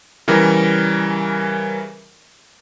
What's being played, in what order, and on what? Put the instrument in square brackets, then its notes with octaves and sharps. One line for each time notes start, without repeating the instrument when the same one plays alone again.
[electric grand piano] C#3 E3 G3 A#4